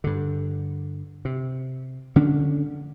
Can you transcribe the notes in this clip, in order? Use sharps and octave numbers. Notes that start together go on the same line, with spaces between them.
G2 D3
C3
D3 C#4 D4